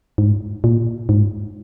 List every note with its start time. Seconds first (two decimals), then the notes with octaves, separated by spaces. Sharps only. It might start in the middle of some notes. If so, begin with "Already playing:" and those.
0.18 G#2
0.64 A#2
1.09 G#2